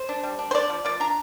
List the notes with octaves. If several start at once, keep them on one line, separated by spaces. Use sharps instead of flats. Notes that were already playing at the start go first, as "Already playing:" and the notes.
Already playing: C5
D4
G3
D4
C5
D4 D5
F3
F3 D5
D4 A#5